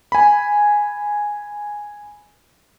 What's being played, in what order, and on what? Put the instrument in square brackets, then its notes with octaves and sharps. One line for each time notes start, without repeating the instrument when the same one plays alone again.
[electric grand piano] G#5 B5